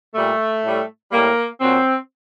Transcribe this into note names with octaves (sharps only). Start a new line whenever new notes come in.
A#2 G3 A3
A2 G3
A2 G3 A#3
A#2 F#3 C4